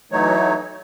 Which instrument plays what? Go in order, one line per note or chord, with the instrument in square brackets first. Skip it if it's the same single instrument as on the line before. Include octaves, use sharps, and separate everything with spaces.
[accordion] E3 F#3 A3 D#4 C#5